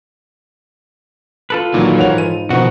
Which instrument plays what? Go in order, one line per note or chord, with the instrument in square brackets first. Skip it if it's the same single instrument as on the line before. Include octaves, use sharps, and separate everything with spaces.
[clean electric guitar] F4 A4 B4
[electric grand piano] A#2 F#3 [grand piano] D#3 D#4 [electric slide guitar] E3
[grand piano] G#2 F7 [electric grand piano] A#4 C#5 F#5
[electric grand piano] D#7
[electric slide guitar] B2 [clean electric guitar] D#3 F#4 [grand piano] F3 F4 [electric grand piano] F#5